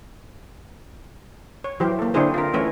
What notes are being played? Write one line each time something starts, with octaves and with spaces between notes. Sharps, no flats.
C#5
E3 F#3 G4 C5
A#3 A4
D3 C4 D4 E4 G#4 C5
F4 A#4
E3 A3 C#4 E4 B4 C#5